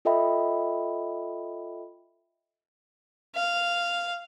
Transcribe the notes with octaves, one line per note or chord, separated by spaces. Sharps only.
F4 A4 D#5 E5 G5 B5
F5